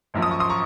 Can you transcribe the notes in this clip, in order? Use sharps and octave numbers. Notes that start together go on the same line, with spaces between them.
G#1 F#2 F3
D#6
C#6
C6 D#6
A#5 C#6